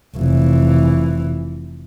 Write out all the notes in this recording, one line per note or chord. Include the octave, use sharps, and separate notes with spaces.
F1 E3